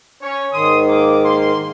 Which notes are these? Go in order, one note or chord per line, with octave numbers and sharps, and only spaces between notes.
C#4 C#5
G#2 D#3 C6 D#6
A#3 D6
A#3 C6